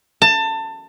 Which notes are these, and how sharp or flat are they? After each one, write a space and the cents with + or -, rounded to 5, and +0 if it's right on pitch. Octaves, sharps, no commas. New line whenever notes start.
A5 +25